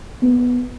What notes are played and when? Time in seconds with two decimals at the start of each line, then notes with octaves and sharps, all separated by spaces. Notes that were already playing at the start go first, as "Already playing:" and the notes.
0.23 B3